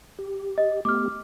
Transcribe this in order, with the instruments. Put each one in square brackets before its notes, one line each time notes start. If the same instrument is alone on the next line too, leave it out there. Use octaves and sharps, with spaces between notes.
[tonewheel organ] G4
[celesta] D#5
[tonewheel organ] A3 B3 G4 [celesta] D6 F6